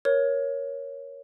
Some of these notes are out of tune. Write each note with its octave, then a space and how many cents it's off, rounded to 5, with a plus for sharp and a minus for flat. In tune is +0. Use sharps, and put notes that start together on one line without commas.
A#4 +15 C#5 +0